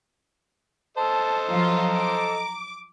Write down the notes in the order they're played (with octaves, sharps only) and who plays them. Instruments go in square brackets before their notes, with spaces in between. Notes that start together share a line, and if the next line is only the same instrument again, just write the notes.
[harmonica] A4 C5 D#5 [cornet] A5
[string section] F3 F#3 F4 [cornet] A#5
[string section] D6